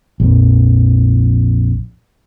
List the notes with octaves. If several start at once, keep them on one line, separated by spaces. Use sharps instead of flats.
A#1 F2